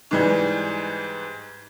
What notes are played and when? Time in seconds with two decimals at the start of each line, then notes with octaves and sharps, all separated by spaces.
0.11 G#2 E3 G3